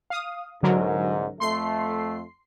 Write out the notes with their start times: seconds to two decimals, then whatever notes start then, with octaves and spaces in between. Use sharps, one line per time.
0.10 F5 D#6
0.63 C2 G#2 D3 F#3 A#4
1.40 F2 A3 C6 C7